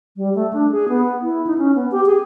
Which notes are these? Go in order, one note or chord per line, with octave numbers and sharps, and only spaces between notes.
G3
A3
D4
G#4
B3
E4
D#4
C#4
B3
G4
G#4